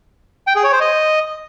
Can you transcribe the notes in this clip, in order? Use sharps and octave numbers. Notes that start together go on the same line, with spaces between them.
G5
G#4
C#5
C5
D#5